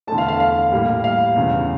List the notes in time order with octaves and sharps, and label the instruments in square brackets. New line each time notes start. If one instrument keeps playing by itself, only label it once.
[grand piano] E2 D3 A3 A5
F5
F5
F5
A2 G3 A#3
F5
E2 C#3 E3